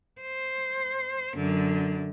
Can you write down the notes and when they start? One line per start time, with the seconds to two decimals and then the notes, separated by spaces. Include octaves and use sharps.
0.21 C5
1.36 F#2 D3